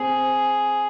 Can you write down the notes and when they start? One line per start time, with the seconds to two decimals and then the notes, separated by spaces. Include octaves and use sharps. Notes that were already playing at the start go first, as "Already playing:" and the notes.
Already playing: C4 G#4